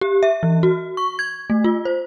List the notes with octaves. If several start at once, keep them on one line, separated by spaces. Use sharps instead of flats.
G4
E5
E3
F#4
C#6
G#6
A3
F4
C5